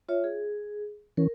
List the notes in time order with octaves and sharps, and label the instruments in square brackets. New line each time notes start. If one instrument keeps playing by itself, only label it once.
[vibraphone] F4 C#5 E5
G#4
[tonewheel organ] E3 C#4 [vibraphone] A#4